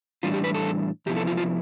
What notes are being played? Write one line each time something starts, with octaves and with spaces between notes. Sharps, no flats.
A2 E3 G3 D4 F4
G4
B4
A4
F2 C3 F3 B3 E4 G4
A4
F4
F4